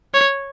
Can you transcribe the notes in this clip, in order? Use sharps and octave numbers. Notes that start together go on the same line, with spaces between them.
C#5